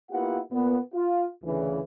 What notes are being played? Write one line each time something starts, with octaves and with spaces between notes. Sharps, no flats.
A#3 B3 E4 F4 G4 F#5
A#2 B3
F4
D2 C#3 E3